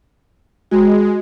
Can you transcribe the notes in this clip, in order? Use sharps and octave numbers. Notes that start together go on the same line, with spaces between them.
G#3 F#4